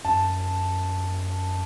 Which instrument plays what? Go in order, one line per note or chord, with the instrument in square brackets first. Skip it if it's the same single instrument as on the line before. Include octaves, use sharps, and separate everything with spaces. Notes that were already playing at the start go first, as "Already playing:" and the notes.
[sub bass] F#2 [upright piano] A5